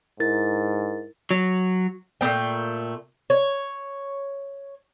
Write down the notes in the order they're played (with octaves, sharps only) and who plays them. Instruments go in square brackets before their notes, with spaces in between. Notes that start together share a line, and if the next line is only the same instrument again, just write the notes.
[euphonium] G#2 [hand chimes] E4 A#4 A6
[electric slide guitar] F#3
[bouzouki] A#2 A3 B3 G5
C#5